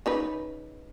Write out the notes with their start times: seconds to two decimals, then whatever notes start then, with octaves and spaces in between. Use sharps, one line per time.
0.06 C#3 D#4 B4